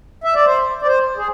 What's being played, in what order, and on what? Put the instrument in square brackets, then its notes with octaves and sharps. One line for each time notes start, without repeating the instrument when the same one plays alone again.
[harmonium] E5
D5
C5
D5
C5
G#4